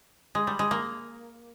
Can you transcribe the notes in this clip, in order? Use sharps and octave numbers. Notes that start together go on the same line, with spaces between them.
G#3
G3
G#3
A#3